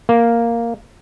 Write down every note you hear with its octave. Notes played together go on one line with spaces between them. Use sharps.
A#3